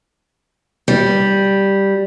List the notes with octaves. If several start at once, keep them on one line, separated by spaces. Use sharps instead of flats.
G3